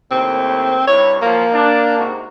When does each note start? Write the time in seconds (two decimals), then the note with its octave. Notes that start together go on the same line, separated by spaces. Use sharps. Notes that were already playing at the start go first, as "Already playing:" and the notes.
0.11 D#2 A2 C4
0.87 G2 C3 E4 C#5
1.22 F3 F#3 A#3
1.52 D4
1.98 G#2 C3 F#4